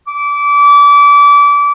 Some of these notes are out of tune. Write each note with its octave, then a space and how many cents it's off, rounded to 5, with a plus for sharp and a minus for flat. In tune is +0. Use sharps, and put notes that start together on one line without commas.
D6 -30